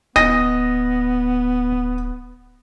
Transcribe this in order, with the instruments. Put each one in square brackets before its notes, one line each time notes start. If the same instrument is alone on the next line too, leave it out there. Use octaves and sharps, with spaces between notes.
[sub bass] D1 [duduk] B3 [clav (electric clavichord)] D#5 [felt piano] A#6